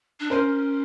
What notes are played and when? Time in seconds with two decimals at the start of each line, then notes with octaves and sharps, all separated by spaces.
0.20 D4
0.30 C#4 A#4 C5